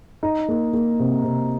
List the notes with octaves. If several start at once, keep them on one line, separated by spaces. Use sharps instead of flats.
D#4
A#3
A#3
C3
C3